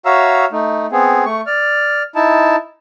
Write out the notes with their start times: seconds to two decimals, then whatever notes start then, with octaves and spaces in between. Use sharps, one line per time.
0.05 F#4 C#5 E5 F5 A#5 E6
0.52 A3 D#4
0.92 B3 C4 G#4
1.26 A3 C#6
1.46 D5 F6
2.15 D#4 E4 A5